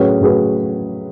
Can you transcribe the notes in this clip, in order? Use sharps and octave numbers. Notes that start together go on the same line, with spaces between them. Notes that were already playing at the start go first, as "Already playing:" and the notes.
Already playing: A2 F#3 C#4 G#4 B4
A2 F#3 C#4 G#4 B4